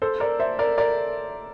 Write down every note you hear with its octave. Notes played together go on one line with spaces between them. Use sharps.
A4 C5
A#4 D5
C5 E5
A#4 D5
A#4 D5